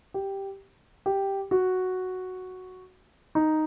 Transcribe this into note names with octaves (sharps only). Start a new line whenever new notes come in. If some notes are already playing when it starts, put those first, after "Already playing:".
G4
G4
F#4
D#4